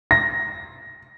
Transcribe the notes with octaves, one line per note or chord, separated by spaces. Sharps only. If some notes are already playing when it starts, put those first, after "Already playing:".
A#6